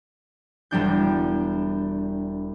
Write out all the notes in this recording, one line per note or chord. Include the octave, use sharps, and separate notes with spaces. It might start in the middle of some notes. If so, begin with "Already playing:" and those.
E1 G3 D4 G6